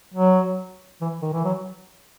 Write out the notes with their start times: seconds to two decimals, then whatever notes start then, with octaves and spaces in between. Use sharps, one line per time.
0.14 F#3
1.01 E3
1.22 D#3
1.33 E3
1.45 F#3